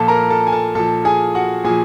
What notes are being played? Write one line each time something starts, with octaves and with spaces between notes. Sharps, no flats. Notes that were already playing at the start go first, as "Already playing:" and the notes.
Already playing: A#2 F3 A4 A5
A#4 A#5
A4 A5
G#5
A4 A5
A#2 F3 A4 A5
G#4 G#5
F#4 F#5
A#2 F3 G#4 G#5